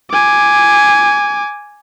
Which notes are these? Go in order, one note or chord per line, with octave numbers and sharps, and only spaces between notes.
G#5 D6